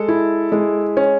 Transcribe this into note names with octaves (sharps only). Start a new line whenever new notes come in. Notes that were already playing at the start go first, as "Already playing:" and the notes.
Already playing: G#3 A4
E4
G#3
C#4